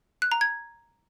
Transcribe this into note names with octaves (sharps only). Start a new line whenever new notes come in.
F#6
A#5
G#6